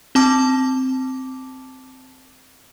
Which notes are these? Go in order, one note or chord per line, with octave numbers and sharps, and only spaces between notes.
C4 A5 D6